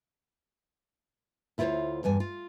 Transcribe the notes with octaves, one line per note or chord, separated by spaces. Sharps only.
D2 E4 F4 G4 C5 C#5
E2 G2 G#5
F4